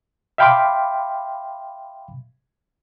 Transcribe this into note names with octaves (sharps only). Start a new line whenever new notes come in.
E5 F5 G5 B5 C6 D6